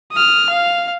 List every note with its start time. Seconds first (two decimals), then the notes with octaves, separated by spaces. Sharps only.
0.12 D#6 F6
0.50 F5